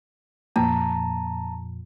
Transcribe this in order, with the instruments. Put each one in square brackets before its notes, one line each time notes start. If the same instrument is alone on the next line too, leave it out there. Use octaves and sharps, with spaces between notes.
[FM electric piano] F2 A#2 F3 [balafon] A#3 [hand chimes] A5 A#5